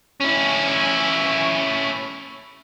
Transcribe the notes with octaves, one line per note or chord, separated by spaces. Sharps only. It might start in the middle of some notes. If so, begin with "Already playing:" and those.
C#4 E4